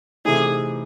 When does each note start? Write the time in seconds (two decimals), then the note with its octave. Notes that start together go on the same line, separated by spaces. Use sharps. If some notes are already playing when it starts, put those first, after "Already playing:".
0.25 C3 E3 A3 D#4 G#4